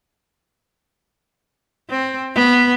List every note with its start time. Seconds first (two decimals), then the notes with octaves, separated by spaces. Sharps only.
1.90 C4
2.35 B3